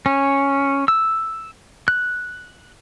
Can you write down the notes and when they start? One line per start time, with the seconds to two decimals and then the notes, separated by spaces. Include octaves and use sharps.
0.06 C#4
0.88 E6
1.88 F#6